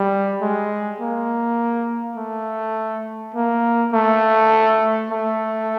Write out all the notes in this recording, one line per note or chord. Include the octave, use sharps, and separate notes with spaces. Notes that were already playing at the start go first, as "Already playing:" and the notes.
Already playing: G3
G#3
A#3
A3
A#3
A3
A3